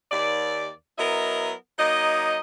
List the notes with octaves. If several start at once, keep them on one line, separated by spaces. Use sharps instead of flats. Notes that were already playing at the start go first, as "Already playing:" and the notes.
D#2 D5
F#3 B3 E4 A#4 D#5
F#3 A#3 D#4 D#5